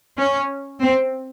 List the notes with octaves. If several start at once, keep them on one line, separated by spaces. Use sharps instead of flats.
C#4
C4